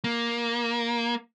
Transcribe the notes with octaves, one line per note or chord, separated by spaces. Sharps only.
A#3